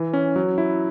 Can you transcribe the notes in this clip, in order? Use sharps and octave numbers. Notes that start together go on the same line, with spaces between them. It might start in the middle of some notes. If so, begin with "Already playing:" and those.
Already playing: E3
C#4
F#3
E4